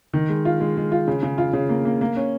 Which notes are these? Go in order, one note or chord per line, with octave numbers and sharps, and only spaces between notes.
D#3
G#3
F4
G#3
G#3
F4
C#3
C#3
F4
C#3
A#3
A#3
A#3
C#4